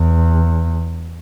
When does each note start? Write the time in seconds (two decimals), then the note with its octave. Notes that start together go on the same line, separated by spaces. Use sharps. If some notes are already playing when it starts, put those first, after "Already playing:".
Already playing: E2